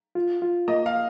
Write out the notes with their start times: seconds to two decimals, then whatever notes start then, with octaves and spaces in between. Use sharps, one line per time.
0.15 F4
0.42 F4
0.68 A#3 D#5
0.86 F5